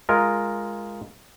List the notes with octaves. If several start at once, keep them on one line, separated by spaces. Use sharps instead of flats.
G#3 F4 A#4